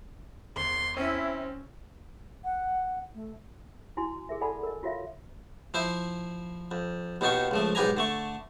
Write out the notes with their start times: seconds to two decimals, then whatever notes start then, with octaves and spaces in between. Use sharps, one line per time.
0.56 G#1 E2 C6
0.97 C4 C#4 E4
2.44 F#5
3.14 A3
3.97 E4 F#4 G#5 C6
4.29 G#4 A#4 E5
4.41 A4 D5 F#5 G#5 A5 B5
4.63 A#4 D#5
4.83 F4 F#4 C#5 E5 F5
5.74 F3 E4 C5
6.71 F2
7.21 D#2 B2 D#3 D#4 F4 C#6
7.51 C#2 F3 A3
7.75 B1 G#2 G4 B4 G#5 A#5
7.97 D3 A3 C#6